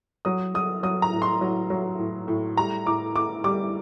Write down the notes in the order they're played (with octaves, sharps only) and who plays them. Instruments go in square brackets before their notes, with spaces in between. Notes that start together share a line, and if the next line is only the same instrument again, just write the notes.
[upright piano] F#3 D#6
F#3 D#6
F#3 D#6
A#5
A2
C6
F#3
F#3
A2
A2
G3 A#5
A2 D6
A2 D6
G3 D6